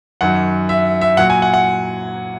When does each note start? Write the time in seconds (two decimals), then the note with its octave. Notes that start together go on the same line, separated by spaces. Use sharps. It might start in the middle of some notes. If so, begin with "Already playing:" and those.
0.21 F#2 D#3 F#3 F#5
0.69 E5
1.01 E5
1.17 A#2 F#3 F#5
1.30 G#5
1.42 F#5
1.54 F#5